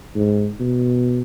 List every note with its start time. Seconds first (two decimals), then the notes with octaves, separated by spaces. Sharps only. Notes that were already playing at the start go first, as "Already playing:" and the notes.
0.15 G#2
0.60 B2